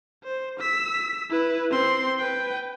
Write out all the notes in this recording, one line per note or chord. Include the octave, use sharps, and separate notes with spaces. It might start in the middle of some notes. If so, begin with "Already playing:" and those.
C5
E6 B6
E4 B4
C4 C6
B4 G5